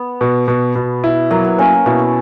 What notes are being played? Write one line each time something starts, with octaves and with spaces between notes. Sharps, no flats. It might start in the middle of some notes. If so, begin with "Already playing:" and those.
Already playing: B3
B2
B2
B2
E4
F#3 A#3
B3
A#3 C#4
B2 E4